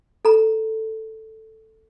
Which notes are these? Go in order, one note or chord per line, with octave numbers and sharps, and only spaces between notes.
A4 A#5